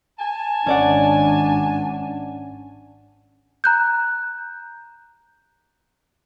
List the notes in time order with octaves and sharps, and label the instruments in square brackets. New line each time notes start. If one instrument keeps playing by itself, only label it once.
[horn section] G#5 A5
[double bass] G#1 D4 [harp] C#4 D5 F#5
[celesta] A#5 F#6 G6